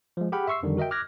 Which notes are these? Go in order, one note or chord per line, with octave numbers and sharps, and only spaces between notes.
F3 G#3
G4 G#4 F#5 G5 B5 F6
E5 C6 C#6 E6 C7
F2 D3 D#3 G3
F#4 A#4 D#5 E5 G5
D6 F6 F#6 G#6 A#6